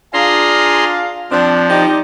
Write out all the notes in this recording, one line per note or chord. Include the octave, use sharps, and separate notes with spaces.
D4 F4 G#4 F5 A#5 C6
F3 C4 D4
D#4 G4 D5